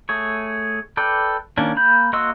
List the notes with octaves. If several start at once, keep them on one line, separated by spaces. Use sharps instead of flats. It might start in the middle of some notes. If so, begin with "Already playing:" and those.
A3 G#4 C#5
A4 B4 D5 G5
D#3 A#3 C#4 D4
A#3 B5 G6
A#3 F#4 D#5 C6 E6